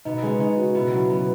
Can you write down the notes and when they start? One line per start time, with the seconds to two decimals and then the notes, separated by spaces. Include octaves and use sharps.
0.05 B2 B3 D#4
0.22 C#3 G#3 C#4
0.39 C#3 C#4 D#4
0.57 F#4
0.75 B2 B3 E4
0.93 F#3
1.09 B2 F#3 B3